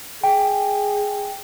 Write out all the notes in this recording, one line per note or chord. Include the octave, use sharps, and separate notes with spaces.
G#4 G5